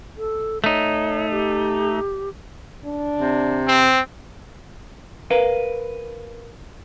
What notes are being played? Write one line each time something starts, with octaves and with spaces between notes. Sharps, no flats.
A4
A3 D#4 C#5
G4
D4
C3
C4
A#4 B4 F5